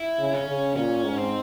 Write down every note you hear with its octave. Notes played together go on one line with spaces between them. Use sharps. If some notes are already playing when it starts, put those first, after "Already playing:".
Already playing: E4
C#3
C#4
C#3
A#2 C#4
G#2
C4